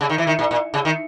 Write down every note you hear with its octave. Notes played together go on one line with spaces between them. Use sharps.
C#3
D#3
E3
D#3
A#2
A#2
C#3
D#3